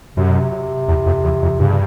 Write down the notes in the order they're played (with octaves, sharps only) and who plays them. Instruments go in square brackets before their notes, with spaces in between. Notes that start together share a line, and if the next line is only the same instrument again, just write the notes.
[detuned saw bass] F#2 [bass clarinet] C3
[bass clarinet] B2
C3
[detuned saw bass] E2
F2
E2
F2
[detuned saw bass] G2 [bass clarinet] C#3